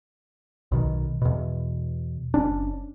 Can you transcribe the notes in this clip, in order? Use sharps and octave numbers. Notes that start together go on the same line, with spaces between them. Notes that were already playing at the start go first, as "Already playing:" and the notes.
B1 B2 D#3
E2 B2
F#1 C#4 D4